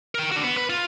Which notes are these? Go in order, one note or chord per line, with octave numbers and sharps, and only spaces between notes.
A#4 G5
D4 F#4
B3
B4
F4